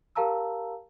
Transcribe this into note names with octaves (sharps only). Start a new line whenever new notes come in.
G4 A#4 F5 A5 A#5 E6